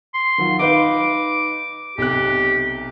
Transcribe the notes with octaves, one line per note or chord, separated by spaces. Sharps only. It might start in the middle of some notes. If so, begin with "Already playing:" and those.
C6
D#3 F#3 F4
D#4 B4 F5 D6
B1 C3 G4 F#6